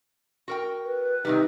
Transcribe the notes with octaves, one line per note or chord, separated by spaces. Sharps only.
F#4 A#4 G5
B4
C3 D#3 G3 D#4